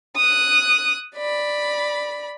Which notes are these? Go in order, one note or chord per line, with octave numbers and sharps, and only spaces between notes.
D#6 F#6
D5 B5